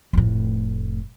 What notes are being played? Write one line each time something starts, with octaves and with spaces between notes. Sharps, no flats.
F1 A2